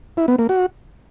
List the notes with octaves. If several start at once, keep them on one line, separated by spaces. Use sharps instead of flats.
E4
B3
A#3
F#4